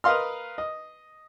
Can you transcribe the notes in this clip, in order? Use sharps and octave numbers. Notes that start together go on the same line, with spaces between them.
A#4 B4 D#5 F5 C6 F6
D#5